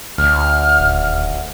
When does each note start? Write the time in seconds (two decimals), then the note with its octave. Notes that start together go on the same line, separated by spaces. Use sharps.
0.18 D2 F6
0.79 D#1